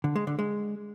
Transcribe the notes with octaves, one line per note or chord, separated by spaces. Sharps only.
D3
G#3
D3
G#3